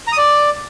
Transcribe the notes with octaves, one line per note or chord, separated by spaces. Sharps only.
A#5
D#6
D5